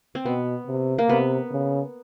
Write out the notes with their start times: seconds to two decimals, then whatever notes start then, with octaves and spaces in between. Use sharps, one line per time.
0.15 C4
0.25 B2 B3
0.67 C3
0.98 A#3
1.09 C3 B3
1.51 C#3